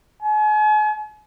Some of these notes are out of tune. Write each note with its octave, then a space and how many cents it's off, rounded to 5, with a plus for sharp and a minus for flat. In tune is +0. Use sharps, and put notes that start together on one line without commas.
G#5 +40